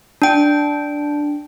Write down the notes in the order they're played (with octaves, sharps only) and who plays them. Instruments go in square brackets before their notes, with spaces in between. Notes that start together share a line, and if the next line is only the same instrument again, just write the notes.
[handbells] D4 G5